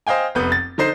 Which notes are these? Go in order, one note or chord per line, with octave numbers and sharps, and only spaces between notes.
C5 D#5 F5 G5 G#5
F1 B3 G6
A6
D3 D#4 C5 C7